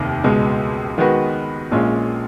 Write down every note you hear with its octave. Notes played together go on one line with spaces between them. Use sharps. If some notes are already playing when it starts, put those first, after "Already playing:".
Already playing: F1 D#2 D#3 A#3
C#2 B2 G#3
D#3 G#3 B3 F#4 B4
A#1 A#2 G#3 C#4 F4